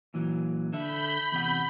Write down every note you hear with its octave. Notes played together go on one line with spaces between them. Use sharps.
A#2 E3 F#3
D3 A4 E5 B5 G6
E2 C3 F#5